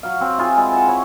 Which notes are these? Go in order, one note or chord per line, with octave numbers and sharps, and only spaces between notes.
F#3 F5
F#3 C4
E4 F4 G#4
G#3
F#5 A5
E4 C#5 E5